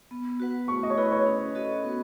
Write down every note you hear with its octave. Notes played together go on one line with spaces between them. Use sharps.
B3
F#4 B4 F#5
A3 C#6
D#5
C#5
E4 G#4 B4
C#5
C#4
F#4 A4 D#5
B3